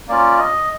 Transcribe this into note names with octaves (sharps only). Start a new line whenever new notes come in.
A#3 C#4 F4 D5
D#5